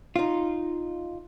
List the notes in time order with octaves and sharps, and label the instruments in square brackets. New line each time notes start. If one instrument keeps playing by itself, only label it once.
[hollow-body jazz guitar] D#4 F4